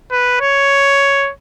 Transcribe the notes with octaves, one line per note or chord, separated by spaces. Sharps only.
B4
C#5